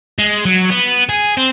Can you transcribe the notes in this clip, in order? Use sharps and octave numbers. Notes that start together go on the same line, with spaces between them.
G#3
F#3
B3
G#4
C4